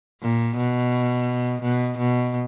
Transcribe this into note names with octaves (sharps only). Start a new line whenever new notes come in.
A#2
B2
B2
B2